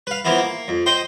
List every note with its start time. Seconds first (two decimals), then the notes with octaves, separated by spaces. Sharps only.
0.07 B4 F5
0.25 E3 F3 A#3 B3 E4
0.38 A#3
0.68 F2
0.86 C5 D#5 G5 C6